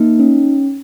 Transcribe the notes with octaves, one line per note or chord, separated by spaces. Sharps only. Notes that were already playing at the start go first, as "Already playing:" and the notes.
Already playing: A#3 D#4
C#4